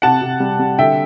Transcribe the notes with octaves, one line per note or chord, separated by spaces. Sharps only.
C3 F#5 A5
C3
G3
G3
D3 E5 G5